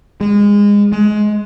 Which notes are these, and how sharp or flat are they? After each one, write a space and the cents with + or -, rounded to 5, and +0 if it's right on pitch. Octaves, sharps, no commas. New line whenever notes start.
G#3 -25
G#3 +20